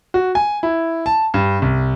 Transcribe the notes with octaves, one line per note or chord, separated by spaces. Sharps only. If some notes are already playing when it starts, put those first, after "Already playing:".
F#4
G#5
E4
A5
G2
C2